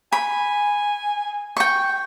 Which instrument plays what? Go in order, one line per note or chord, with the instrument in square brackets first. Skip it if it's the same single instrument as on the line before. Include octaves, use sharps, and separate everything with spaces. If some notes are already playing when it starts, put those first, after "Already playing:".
[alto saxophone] G#5 [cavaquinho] B5
[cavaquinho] G5 C#6